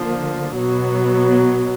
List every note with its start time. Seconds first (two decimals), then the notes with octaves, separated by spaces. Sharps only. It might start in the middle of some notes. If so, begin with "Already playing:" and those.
Already playing: D3 F3 A#3
0.56 B2 F#3 B3